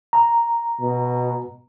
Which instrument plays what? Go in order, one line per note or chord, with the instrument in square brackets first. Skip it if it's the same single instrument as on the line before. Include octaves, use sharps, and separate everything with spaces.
[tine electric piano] A#5
[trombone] B2